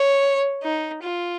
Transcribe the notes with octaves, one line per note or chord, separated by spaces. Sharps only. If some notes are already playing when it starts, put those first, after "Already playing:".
Already playing: C#5
D#4
F4